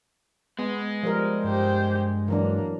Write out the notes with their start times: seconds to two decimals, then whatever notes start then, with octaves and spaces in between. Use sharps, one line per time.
0.59 G#3 B3
1.03 F3 G3 A#4
1.44 G2 G4 C5
2.28 E3 F#3 A#3 D4